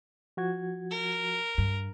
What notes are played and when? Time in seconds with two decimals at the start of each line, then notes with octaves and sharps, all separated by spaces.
0.37 F3 F#4 G#6
0.90 A#4
1.58 G2